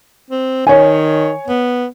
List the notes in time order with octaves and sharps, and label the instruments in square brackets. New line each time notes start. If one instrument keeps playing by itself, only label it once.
[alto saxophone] C4
[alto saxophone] D#3 [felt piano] C#5 G#5
[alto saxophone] B3